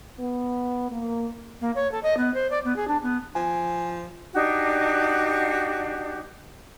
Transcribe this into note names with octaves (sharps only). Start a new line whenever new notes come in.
B3
A#3
A#3
C#5
A4
D#5
B3
C5
D5
B3
G#4
D4
B3
F3 G#5
D4 D#4 F#4 G4